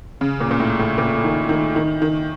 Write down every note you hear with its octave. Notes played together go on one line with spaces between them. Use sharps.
C#3
A#2
A#2
A2
A2
A#2
D#3
D#3
D#3
D#3